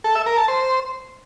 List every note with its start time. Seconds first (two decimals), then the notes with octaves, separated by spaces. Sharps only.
0.04 A4
0.15 E5
0.26 A#4
0.37 A5
0.48 C5